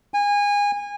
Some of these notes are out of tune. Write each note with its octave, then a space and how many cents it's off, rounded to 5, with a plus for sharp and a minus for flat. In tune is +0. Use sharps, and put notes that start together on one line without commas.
G#5 -25